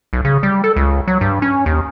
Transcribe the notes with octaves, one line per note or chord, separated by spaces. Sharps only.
B1
C#3
G3
A4
C#2
F#3
G2
C#4
D#2